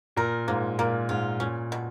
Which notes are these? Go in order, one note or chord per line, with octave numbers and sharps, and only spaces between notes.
A#2 A#4
G#2 A#3
A#2 A#3
G#2 F4
A#2 C#4
B2